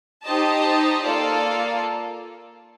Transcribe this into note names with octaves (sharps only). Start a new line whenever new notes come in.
D#4 G4 C5 D#5 A5
A#3 F4 A4 D5